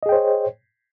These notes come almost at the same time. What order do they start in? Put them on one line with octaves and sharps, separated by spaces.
D#5 G#4 G5 C5 C#5